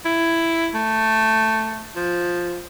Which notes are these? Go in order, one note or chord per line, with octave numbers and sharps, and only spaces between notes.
E4
A3
F3